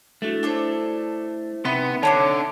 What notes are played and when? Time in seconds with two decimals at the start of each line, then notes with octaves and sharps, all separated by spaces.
0.22 A3 D4 E4 F#4
0.43 D4 E4 A4 C5 C#5
1.65 C3 B3 D#4 E5 B5 C6
2.03 D3 C#5 A5 A#5 D6